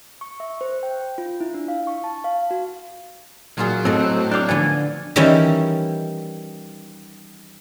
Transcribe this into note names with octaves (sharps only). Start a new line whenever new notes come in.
C#6
E5
C5
G5
F4
E4
D4
F5
C#6
A5
F5
F#4
A#2 F#3 F4 G#4
A2 C4 A4 D#5
D4 G4 F5 G5 D6
D3 F3 B3 D5 G#5
D#3 E3 G3 C#4 E4